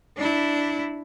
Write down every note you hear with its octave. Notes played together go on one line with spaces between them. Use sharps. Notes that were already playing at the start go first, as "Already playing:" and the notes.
D4 E4